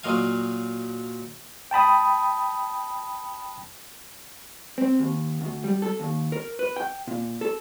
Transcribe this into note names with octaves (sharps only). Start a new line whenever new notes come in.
A#2 F#3 D#5 F5 G#5
G5 A5 B5 D#6
C4
D#2
D2
G3
A4
D#2
A#4
B4
G5
A#2
A4